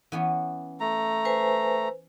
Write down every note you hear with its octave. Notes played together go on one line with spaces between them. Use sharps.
E3 B3 C#4
A3 A#5
B4 C5 G#5